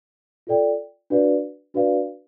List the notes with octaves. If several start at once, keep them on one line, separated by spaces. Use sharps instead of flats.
F4 A4 D5 G5
D4 F#4 B4 D5 F5
D4 F#4 B4 D5 F5